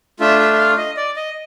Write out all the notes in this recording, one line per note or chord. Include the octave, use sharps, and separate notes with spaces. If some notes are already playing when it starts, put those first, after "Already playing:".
A3 D4 F4 E5
E5
E5
F5
D#5
D5
D#5